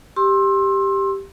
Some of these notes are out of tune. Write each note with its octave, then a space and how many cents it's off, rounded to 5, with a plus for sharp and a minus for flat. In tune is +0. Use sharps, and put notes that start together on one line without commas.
G4 +0 C6 +25 E6 +0